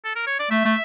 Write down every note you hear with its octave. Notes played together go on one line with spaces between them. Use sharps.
A4
A#4
C#5
D5
A3 E5
A3